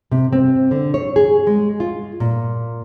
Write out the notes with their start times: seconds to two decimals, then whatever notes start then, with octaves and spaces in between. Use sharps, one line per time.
0.11 C3
0.33 C4
0.71 D3
0.94 C#5
1.16 G#4
1.47 G#3
1.80 F4
2.20 A#2